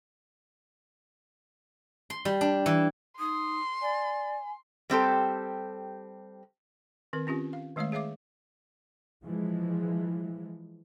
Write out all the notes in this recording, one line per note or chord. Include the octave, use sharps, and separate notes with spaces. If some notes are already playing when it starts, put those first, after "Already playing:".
C6
G3
D4
E3
D#4 C6 D#6
D5 G#5
G3 C4 G4 A4
D#3 C4 A#4
C4 C#4 F4 G4
F5
D#3 G#3 A3 C#5 E5 F5
G#4 C#5 E5 F5 D6
E3 F3 G#3